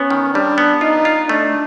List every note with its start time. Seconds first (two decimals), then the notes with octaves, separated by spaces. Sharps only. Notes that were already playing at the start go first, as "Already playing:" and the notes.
Already playing: B3 C#4
0.10 D#3
0.34 G3 D4
0.58 B3
0.81 D#4 F4
1.05 F4
1.29 A3 D4